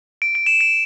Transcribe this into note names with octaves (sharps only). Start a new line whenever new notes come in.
D7
D7
E7
D7